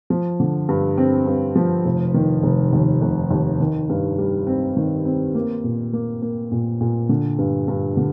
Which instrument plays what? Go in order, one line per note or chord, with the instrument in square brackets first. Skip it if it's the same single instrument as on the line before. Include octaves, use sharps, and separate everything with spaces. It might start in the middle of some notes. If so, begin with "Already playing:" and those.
[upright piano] F3
D3
G2
C4
G2
F3
F1
D#3
F1
D#2
F1
D#2
D#3
G2
G3
C4
D#3
C4
A#3
A#2
A#3
A#3
A#2
A#2
D3
G2
G2
D3